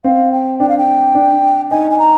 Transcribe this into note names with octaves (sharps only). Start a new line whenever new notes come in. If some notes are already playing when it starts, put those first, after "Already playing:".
C4 F5
G5
D4 G5
F5
G5
D4
D#4 G#5
G#5
A#5